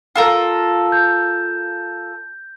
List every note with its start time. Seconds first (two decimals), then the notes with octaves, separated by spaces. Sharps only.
0.16 F4 A4 A#4
0.92 G6